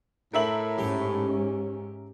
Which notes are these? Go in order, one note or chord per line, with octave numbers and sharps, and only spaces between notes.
A2 A#4 E5 F#7
G#2 C#4 G4